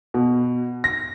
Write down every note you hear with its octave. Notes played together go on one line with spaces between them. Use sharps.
B2
A#6